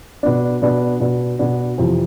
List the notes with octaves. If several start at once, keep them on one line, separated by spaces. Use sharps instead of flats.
B2 B3 D4
B2 B3 D4
B2 B3 D4
B2 B3 D4
F2 C3 E3